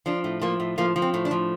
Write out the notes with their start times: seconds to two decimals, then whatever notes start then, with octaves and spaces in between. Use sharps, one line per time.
0.06 F3 D4
0.24 A2
0.41 F3 A#3
0.60 A2
0.78 F3 A#3
0.96 F3
1.02 C4
1.14 A2
1.25 D4
1.31 F3